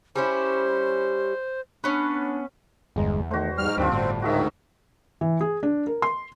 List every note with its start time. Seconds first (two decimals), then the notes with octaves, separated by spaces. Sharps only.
0.16 G3 C#4 E4 C5
1.84 B3 C#4 D4 B4
2.96 G1 E2 G#3 A#5
3.31 D#3 A3 F#4 C5
3.58 G#2 G3 F6
3.77 D2 G2 D#3 G3 C4 D4 F4
3.92 G1 A2 F#4
4.22 D2 G#2 D#3 F4 F#4 G#4 E5
5.21 E3
5.41 G#4
5.63 D4
5.87 A#4
6.02 C6